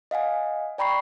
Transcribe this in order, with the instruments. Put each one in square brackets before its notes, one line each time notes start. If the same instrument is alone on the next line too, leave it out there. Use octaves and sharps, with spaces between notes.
[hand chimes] D#5 F5 F#5 G#5
D5 G5 A#5 B5 C#6 C7